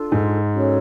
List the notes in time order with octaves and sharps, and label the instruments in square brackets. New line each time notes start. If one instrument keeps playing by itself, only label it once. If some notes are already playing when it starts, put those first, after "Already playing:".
Already playing: [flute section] D4 F4 A4
[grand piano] G#2
[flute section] C#4 F#4 A4 C#5